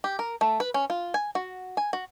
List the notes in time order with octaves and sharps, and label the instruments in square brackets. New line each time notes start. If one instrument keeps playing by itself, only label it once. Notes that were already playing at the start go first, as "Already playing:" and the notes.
[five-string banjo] G4
A#4
A3
B4
C#4
F4
G#5
F#4
G#5
F#4